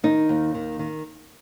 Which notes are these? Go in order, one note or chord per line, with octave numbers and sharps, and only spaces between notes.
D#3 D#4
D#2
D#3
D#3